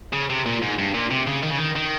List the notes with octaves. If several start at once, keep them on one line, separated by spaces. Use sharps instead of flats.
C#3
C3
A#2
G#2
G2
A#2
C3
C#3
D#3
C#3
D#3
D#3